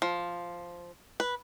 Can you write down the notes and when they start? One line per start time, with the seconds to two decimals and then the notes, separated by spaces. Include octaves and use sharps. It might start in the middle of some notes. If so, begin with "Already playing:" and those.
0.02 F3
1.20 B4